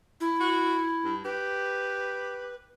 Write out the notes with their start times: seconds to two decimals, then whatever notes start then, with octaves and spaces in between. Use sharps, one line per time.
0.21 E4
0.40 F#4
1.04 G2
1.24 G4 B4